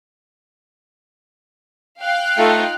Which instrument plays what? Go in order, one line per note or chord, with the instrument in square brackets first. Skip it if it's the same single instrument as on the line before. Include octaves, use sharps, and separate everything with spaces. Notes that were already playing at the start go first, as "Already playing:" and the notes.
[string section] F5 G5 [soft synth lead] F#6
[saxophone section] A3 [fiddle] D#4 F4